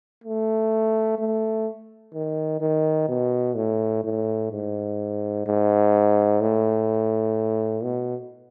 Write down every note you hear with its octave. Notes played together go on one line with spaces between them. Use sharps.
A3
A3
D#3
D#3
B2
A2
A2
G#2
G#2
A2
B2